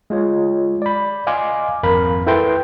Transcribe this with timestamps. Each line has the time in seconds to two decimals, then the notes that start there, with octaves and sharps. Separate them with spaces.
0.10 G#3 F4 C#5
0.82 D5 B5
1.27 D#5 F5 G#5 C6 D6
1.83 G#1 F2 A#4 F5 B5
2.27 E4 A4 B4 G5 C6